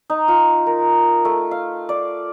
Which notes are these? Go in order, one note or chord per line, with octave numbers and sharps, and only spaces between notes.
D#4
F4
A#4
A3
F5
D5